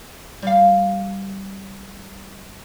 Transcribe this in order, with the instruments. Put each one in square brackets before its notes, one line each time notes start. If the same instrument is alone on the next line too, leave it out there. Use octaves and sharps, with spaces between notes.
[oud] G3 F5